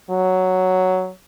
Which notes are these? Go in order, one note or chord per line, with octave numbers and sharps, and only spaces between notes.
F#3